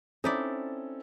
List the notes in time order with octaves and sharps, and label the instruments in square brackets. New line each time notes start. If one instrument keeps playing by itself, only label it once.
[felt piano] C4 C#4 A4 [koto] D#4 E4 D5